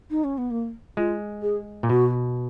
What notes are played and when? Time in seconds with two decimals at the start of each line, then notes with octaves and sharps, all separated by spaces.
0.10 D#4
0.24 C#4
0.38 B3
0.51 A#3
0.97 G#3 F4
1.42 G#4
1.83 A#2
1.89 B2 F#4